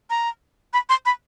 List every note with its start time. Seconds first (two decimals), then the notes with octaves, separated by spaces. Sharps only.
0.10 A#5
0.73 B5
0.89 C6
1.06 B5